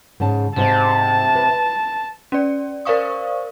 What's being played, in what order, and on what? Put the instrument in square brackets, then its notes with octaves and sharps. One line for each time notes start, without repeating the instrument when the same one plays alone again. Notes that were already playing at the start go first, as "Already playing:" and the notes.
[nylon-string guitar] G#2 C#3 A5
[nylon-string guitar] G#2 C5 D#5 [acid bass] C3 [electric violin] A5
[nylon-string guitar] B4
[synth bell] C#4 D5
A#4 C5 D5 F5 C#6 D#6